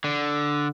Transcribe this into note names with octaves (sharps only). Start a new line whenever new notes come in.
D3